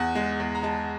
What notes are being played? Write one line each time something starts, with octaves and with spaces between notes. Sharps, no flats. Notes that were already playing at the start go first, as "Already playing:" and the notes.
Already playing: E2 F#5
G#3
E2
A#5
G#3 A5